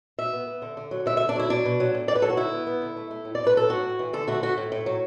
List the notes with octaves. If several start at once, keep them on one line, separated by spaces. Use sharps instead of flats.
B2 E5
B3
B3
D3
D3
F#3
D3 E5
E5
D3
D4
F#3 E4
B2 D4
B2
F#3
A2
A2 D5
B4
F#3 A4
F#4
D3 E4
B3
B3
D3
A3
A3
A2
D5
A2
B4
F#3 A4
A2 F#4
A2
E3
D3 A4
A3 F#4
A3 F#4
A2
A2
F#3